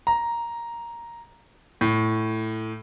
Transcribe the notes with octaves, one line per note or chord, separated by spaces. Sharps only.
A#5
A2